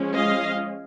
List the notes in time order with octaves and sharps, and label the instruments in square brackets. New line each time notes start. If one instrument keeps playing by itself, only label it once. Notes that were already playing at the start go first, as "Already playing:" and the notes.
Already playing: [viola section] F3 G#3 C#4
D#5 F5